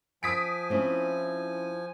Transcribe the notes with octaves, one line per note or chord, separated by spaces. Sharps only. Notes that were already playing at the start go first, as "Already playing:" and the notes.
F3 G#5 D#6 B6 D7
C4 C#4 E4